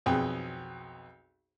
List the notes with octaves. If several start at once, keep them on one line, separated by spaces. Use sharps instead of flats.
B1 F2 G#4 G5